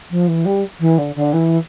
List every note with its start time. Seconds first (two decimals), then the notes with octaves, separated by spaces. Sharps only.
0.10 F3
0.27 E3
0.45 G3
0.79 E3
0.97 D3
1.15 D3
1.32 E3